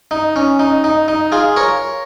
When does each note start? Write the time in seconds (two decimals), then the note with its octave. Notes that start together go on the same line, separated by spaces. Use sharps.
0.11 D#4
0.36 C#4
0.59 D#4
0.84 D#4
1.08 D#4
1.32 F4 G#4
1.56 A#4 C#5